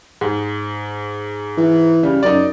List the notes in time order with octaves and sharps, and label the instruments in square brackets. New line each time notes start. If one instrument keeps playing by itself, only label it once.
[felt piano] G#2
[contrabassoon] E3
[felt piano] C#3 G3
[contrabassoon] F#2 [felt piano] D#4 D5